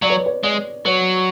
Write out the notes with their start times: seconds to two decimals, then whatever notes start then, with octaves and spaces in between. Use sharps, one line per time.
0.02 F#3 D5
0.10 C#5
0.18 B4
0.26 C#5
0.43 G#3 D5
0.85 F#3 C#5